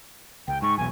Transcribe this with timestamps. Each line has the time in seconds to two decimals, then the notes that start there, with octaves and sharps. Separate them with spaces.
0.48 C#2 G5
0.62 G#2 C#6
0.78 B1 E2 B2 G#5